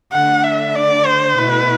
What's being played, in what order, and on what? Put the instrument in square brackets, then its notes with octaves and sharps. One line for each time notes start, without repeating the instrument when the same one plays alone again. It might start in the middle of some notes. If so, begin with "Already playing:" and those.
[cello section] D3 A3 D4 [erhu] F#5
[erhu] E5
D5
C5
[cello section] B2 A3 E4 [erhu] B4